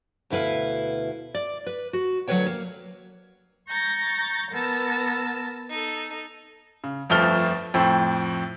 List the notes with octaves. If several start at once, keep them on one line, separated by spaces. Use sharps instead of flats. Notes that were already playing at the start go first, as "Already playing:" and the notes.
D2 B2 E4 B4 F5
D5
B4
F#4
D2 F#3 G3 B4 C#5 G5
A#3
A#5 C#6 G6 A6 A#6
B3 A#4 A5 E6
D#4 A4
C#3
G1 F2 F3 A3 F6 G7
F2 A2 C4